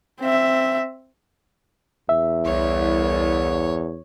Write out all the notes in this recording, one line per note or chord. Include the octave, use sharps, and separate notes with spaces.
C4 E5
E2 E5
C2 C#5